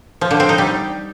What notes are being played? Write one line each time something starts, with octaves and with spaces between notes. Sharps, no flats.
F3
D3
C4
D#4
G3